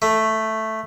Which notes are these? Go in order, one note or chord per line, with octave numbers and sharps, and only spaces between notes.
A3